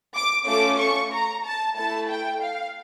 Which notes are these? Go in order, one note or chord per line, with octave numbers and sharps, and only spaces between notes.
D6
A3 C#4 F4 A4 D6
C#6
A#5
A5
A3 E4 A4 A5
G5
F5